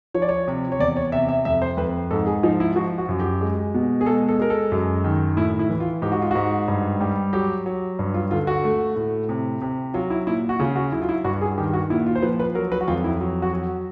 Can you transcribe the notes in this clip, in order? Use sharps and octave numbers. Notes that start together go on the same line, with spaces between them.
F3 C#5
D5
C#5
C3
C#5
E2 D5
C#5
C3 E5
E5
F2 E5
C5
F2 B4
G#2 A4
G#4
F3 D#4
E4
F3 F#4
F#4
F#2
G4
G#3
B2
G#4
G#3 A4
A4
G#3 A#4
A4
F#2
D#3
A2 E4
E4
E3
F4
G#2 G4
F#4
F4
G#2 F#4
G2
G3
F#3 G4
F#3
G2
F4
D3 F4
F#4
A3
A2
C3
C3
F#3 F4
E4
A#2 E4
F#4
C#3 F4
F#4
F#3 E4
F4
E4
G2 F#4
G#4
D#3 G4
F#4
A#2 E4
F4
C5
F3 B4
B4
F#3 A#4
B4
F#4
F2 F4
E4
F#3
F#4
F#3